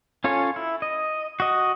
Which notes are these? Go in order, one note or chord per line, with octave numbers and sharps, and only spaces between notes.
C#4 F4 A4 C#5 G#5
E4
D#5
F#4 D#5